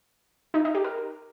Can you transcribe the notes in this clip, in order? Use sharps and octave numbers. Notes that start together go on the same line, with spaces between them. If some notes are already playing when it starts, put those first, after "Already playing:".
D#4
D#4
G4
A#4